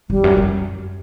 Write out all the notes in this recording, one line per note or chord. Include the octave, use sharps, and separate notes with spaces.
E2 G3
F#2
F#2